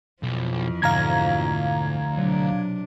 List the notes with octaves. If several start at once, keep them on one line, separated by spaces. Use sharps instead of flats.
B1 F2 E3 F3
D2 G#2 B2 F5 A#5 G#6
B1 C3 F#3 D4 C#5